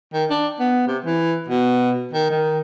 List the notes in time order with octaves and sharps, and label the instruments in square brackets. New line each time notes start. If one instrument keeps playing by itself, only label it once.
[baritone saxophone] D#3
D4
B3
C3
E3
B2
D#3
D#3